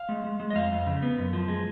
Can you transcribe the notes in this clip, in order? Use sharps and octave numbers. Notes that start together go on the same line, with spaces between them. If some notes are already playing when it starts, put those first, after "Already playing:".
Already playing: F5
G#3
G#3
G#3
D#5
F2 F5
F2
C#3
B3
F#2
F3
G#3